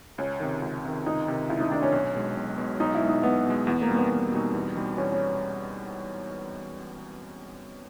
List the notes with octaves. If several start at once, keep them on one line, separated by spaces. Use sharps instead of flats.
C#2 C#4
C3 D#3
C#2
C3 D#3
C#2 D#4
C3 D#3
C#2 E4
D#4
C3 D#3 D4
C#4
B1
B2 G#3
B1
B2 G#3
B1 D#4
E4
B2 G#3
D#4
B1 B3
B2 G#3
E2 B3
A#3
B2 G3 C4 D#4
B3
E2
B2 G3 C4 D#4
E2
B2 G3 C4 D#4
E2 C#4
C#4